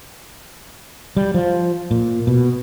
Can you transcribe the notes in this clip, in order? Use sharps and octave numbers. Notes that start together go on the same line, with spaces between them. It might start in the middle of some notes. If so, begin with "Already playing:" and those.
G3
F3
A#2
B2